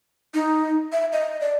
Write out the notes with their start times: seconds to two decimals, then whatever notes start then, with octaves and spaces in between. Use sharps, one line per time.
0.34 D#4
0.92 E5
1.13 D#5
1.41 D5